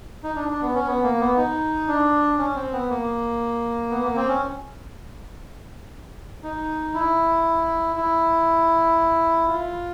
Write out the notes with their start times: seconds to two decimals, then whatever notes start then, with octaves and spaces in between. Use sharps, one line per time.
0.24 D#4
0.36 D4
0.49 D4
0.62 B3
0.74 C#4
0.87 B3
1.03 A#3
1.20 B3
1.37 D#4
1.88 D4
2.38 C#4
2.55 C4
2.72 B3
2.89 A#3
3.90 B3
4.03 A#3
4.16 C4
4.28 C#4
6.43 D#4
6.95 E4
7.96 E4
9.48 F4